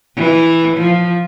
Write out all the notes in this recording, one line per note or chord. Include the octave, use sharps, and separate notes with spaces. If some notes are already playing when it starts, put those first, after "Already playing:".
E3
F3